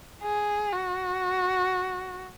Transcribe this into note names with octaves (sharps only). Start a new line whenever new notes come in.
G#4
F#4